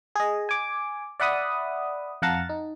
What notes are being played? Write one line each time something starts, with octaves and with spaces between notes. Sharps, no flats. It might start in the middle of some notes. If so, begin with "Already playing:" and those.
G#4 D#5
G#5 D6
D5 E5 F#5 B5 D#6
F2 F5 F#5 A5 A#5 A6
D#4